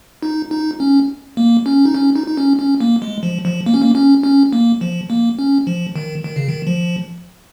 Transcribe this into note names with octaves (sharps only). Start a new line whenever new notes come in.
D#4
D#4
C#4
A#3
C#4
D#4
C#4
D#4
D#4
C#4
C#4
A#3
G#3
F3
F3
A#3
C#4
A#3
C#4
C#4
A#3
F3
A#3
C#4
F3
D#3
D#3
C#3
D#3
F3